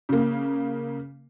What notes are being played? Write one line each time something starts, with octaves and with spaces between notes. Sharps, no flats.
C#3 A#3